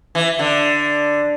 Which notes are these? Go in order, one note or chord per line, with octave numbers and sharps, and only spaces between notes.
E3
D3